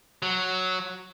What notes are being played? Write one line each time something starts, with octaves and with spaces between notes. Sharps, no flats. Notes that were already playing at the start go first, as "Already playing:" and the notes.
F#3